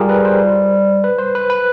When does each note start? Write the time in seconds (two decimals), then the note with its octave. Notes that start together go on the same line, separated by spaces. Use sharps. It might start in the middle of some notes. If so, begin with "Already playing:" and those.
Already playing: G3 F4 G4 G#4 A#4
0.09 B4
0.25 C5
1.04 B4
1.19 C5
1.35 B4
1.50 B4